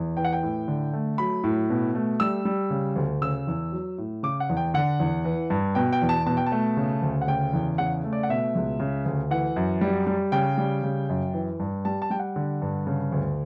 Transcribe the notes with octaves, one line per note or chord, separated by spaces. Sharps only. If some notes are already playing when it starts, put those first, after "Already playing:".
Already playing: E2
E3 G5
F#5
G5
A2
D3
A3
F#3 B5
A2
B2
A3
G3 E6
G3
C#3
D2
C#3 E6
E2
F#3
A2
C#3 D6
F#5
E2
G5
D3 F#5
E2
E3
G2
B2 G5
G5
E2
A5
B2 A5
G5
A5
A3
C#3
D2
F#5
C#3 G5
E2
C#3 F#5
A3
D5
F#5
B2 E5
C#2
C#3
D2
E3 F#5
F#2
G3
G3
C#3 G5
G3
C#3
F#2
E3
G2
G3 A5
A5
G3 G5
F#5
D3
G2
C#3
D2